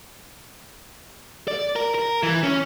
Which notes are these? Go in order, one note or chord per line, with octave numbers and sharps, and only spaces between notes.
D5
A#4
A#4
E3
C#4